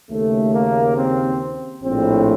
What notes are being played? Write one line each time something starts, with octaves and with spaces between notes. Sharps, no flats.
D#2 C#3 A3
A#3
C4
A#1 A2 C4